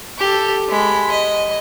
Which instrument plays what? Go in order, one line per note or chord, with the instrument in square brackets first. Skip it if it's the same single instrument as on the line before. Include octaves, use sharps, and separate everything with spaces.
[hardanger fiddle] G4 A4
G#3 B5
D#5